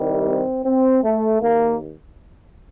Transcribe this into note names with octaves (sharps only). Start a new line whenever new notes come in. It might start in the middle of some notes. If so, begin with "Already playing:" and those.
Already playing: C2 C3 D#3 G3
C4
C4
A3
D#2 A#3